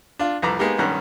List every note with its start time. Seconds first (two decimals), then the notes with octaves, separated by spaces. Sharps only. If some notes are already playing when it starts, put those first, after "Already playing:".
0.19 D4 F4
0.42 C2 F2 B4 A#5 D6
0.59 G#3 A#3 B3 D#4 G4
0.79 B1 G2 D#3 C#4 A#5 F#6